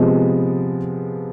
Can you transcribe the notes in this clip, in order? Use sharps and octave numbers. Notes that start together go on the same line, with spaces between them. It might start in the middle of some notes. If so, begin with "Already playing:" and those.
Already playing: C3 F3 G#3 B3